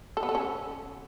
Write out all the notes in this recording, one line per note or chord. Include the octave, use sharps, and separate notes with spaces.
A4
B3
A4
C#4